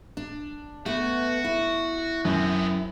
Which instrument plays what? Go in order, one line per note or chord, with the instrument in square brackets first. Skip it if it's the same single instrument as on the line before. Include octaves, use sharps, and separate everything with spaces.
[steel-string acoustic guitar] D4
[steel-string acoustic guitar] A3 B3 [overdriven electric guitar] F#4
[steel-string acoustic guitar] E4
[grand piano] F#2 [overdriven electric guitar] B3 C4